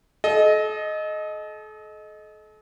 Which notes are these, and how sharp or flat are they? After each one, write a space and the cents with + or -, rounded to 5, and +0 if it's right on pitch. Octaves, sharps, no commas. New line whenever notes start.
A4 -40 D#5 +0